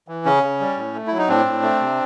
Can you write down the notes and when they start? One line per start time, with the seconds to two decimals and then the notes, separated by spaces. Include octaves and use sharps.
0.08 E3
0.25 C#3 C#4
0.43 C#3
0.60 G3
0.77 A2
0.94 A3
1.07 F#3 E4
1.18 D#4
1.29 A2 C4 D4
1.46 A2
1.63 A3
1.81 C3